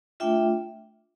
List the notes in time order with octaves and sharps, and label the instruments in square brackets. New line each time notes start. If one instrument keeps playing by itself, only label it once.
[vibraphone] A3 D4 F4 E5 G5